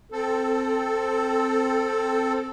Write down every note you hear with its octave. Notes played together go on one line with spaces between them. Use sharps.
C4 A4